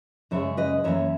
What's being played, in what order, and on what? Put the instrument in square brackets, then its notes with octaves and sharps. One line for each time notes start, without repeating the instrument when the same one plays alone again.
[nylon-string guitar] F#2 C#3 G#3 C#5 E5
B4 D#5
F#2 E3 A#3 C#5 E5